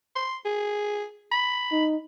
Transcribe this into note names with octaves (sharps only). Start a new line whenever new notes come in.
C6
G#4
B5
D#4